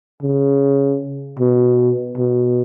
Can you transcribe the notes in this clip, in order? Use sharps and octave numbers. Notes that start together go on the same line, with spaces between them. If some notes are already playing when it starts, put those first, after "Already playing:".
C#3
B2
B2